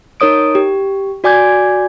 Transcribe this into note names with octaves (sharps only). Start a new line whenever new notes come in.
D#4 A#4 C#5 D#6 D7
G4
F#4 D5 G#5 D6 G6 G#6